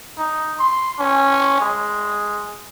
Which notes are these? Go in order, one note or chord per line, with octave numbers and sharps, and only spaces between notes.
D#4
C6
C#4
G#3